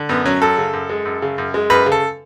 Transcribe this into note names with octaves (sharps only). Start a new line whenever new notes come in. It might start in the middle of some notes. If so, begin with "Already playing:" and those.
Already playing: D3
F#2 B3
F#3 C#4
F#2 A4
C#3
F#2
G#3
F#2
C#3
F#2
G#3
F#2 B4
C#3
A4